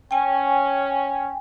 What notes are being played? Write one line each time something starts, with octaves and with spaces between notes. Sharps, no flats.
C#4 G5 G#5